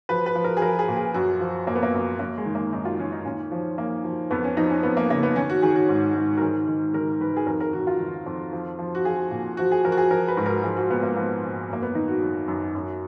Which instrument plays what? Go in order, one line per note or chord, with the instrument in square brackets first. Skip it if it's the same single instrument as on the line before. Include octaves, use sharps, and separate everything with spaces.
[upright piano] F3 B4
B4
F3
A#4
G#4
F3 A#4
G#4
A#2
G#4
F#2 F#4
F3
F#2 A#3
B3
A#3
F#2
F#2 A#3
G#3
D#3
A#3
F#2 D#4
F4
D#3 C#4
D#4
A#2 C#4
F3
F3 A#3
F3
F2 B3
C#4
F3 D#4
C#4
F2 B3
A#3
C#3 A#3
B3
D#3 C#4
F#4
D#3 G#4
F#4
G#2
G#2
A#4
D#3 G#4
D#3
D#3 A#4
D#3 B4
G#4
F2 A#4
A#4
D#3 F#4
F4
D#3
F2
F3
F3
F#4
F3 G#4
A#2
F3 F#4
G#4
F3 A#4
F#4
G#4
F3 A#4
B4
G#2
A#4
F3 G#4
F#4
A#2 B3
A#3
F3 B3
A#2
F#2 A#3
B3
D#3 D#4
F#4
F#2
F#2
F#2